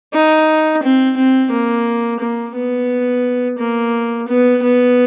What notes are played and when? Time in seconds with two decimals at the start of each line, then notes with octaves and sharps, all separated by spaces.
0.14 D#4
0.83 C4
1.17 C4
1.52 A#3
2.20 A#3
2.55 B3
3.59 A#3
4.28 B3
4.63 B3